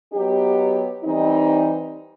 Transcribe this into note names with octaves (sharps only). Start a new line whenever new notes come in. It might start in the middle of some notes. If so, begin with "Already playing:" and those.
F#3 B3 D#4 G4
E3 G3 C4 D#4